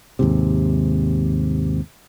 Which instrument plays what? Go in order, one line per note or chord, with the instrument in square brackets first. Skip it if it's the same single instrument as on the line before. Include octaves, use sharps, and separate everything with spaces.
[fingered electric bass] D#2 G#2 C3